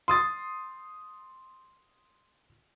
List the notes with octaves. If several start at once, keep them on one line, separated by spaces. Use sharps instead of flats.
C6 D#6 A6